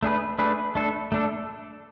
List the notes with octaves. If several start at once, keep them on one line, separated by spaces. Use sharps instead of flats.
A3 D4 G#4 B4
A3 D4 G#4 B4
A3 D4 A4
A3 D4 A4